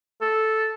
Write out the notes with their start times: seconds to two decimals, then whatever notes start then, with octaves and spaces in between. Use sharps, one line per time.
0.21 A4